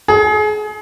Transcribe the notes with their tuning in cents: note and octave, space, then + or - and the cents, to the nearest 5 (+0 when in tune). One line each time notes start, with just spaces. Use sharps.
G#4 +30